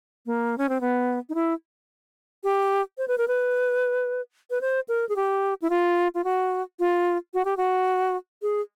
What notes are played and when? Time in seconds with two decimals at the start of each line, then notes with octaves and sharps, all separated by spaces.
0.26 A#3
0.58 C#4
0.69 C4
0.81 B3
1.29 D#4
1.35 E4
2.44 G4
2.98 C5
3.08 B4
3.18 A#4
3.28 B4
4.50 B4
4.61 C5
4.88 A#4
5.09 G#4
5.16 G4
5.62 E4
5.70 F4
6.14 F4
6.24 F#4
6.79 F4
7.34 F#4
7.45 G4
7.57 F#4
8.42 G#4